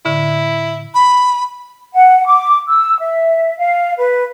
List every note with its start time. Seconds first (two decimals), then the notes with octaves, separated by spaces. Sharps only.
0.05 A2 D3 E4
0.95 B5
1.94 F#5
2.26 D6
2.68 E6
3.01 E5
3.57 F5
3.98 B4